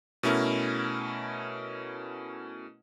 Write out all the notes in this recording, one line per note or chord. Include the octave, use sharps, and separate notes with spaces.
B2 A3 C#4 E4 A#4